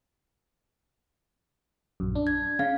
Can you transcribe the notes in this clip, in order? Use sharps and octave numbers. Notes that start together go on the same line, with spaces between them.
A#1 F#2
D4
G#6
C#3 F5